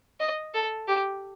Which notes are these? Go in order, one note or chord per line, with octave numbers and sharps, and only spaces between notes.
D#5
A4
G4